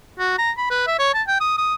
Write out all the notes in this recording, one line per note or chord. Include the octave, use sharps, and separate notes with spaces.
F#4
A#5
B5
B4
E5
C#5
A5
G5
D#6
D#6